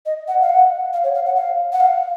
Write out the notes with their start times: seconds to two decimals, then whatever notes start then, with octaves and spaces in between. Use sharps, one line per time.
0.06 D#5
0.28 F#5
0.41 F5
0.49 F#5
0.93 F5
1.04 C#5
1.15 F5
1.26 F#5
1.36 F5
1.73 F#5
1.80 F5